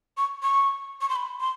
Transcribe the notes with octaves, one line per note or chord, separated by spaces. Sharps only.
C#6
C#6
C#6
C6
B5
C6